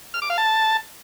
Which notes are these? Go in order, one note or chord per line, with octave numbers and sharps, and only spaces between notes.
F6
D6
F5
A5